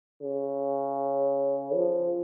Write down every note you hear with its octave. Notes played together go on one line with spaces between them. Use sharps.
C#3
F3